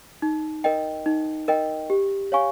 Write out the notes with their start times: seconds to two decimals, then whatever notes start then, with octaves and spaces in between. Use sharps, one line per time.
0.22 D#4
0.64 A#4 D#5 G5
1.06 D#4
1.48 A#4 D#5 G5
1.90 G4
2.32 C#5 F5 G#5 C#6